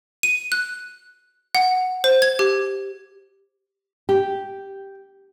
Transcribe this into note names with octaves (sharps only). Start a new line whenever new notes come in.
D#7
F#6
F#5
C5
G#6
G4
G4